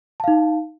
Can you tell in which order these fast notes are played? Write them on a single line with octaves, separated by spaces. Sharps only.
A5 F5 D#4